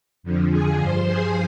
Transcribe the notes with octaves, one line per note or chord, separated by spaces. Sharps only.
F2 D3 F3
G#4 G#5
G2 F3 C5 C6
G#4 G#5